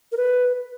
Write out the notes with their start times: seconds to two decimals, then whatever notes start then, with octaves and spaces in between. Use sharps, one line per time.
0.12 A#4
0.17 B4